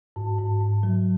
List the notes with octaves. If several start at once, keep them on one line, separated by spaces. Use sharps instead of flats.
G#2
G#2
G#2
F#3